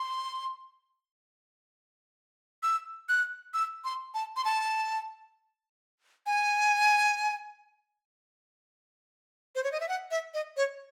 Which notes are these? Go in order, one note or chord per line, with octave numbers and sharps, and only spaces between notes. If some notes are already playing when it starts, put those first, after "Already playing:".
Already playing: C6
E6
F#6
E6
C6
A5
C6
A5
G#5
C5
C#5
D#5
E5
F#5
E5
D#5
C#5